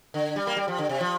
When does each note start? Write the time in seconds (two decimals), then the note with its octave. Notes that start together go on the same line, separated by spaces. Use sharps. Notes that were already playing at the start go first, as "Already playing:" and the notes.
0.14 D3
0.36 G3
0.47 A#3
0.57 G3
0.68 F3
0.78 D3
0.89 C3
1.01 F3